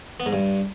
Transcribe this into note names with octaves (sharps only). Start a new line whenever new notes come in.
B3
G#2
G2